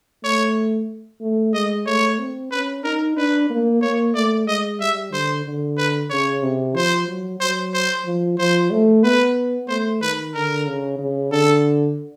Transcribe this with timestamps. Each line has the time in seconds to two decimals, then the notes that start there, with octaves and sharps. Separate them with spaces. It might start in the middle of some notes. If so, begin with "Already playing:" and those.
0.24 A3 C#5
1.21 A3
1.54 G#3 D#5
1.86 A3 C#5
2.19 C4
2.51 C#4 B4
2.84 D#4 A#4
3.17 D4 B4
3.50 A#3
3.82 A#3 C#5
4.15 A3 D5
4.47 G#3 D#5
4.80 G3 E5
5.12 D3 C5
5.45 D3
5.78 B4
6.10 C#3 C#5
6.43 C3
6.76 F3 C5
7.08 F#3
7.41 F#3 C5
7.74 C5
8.06 F3
8.39 F3 C5
8.71 A3
9.04 B3 B4
9.68 A3 C5
10.02 D#3 B4
10.34 D3 A#4
10.67 C#3
11.00 C#3
11.32 D3 A4